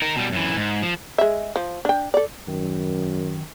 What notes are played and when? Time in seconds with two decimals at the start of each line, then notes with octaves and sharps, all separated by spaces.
0.02 D#4 A#4
0.16 B2 G3
0.32 F#2 E3
0.56 G#2
0.82 F3
1.18 G#3 E5
1.56 F3
1.85 D4 G5
2.14 A4 D5
2.48 F#2 D#3